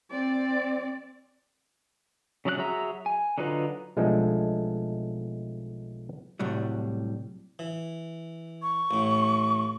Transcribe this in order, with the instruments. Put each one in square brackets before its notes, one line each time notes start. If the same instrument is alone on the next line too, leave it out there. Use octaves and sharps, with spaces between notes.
[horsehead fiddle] C4 D5
[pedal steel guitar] C#3 F#3 D5 F#6
F#3 F#4 G#4 E5 A#5
G#5
D3 F#3 D#4 F4 B4
[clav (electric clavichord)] B1 F3 G#3 A3 D4 A4
[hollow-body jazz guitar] C2 A2 F#3 G3
[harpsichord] E3
[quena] C#6
[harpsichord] A1 A2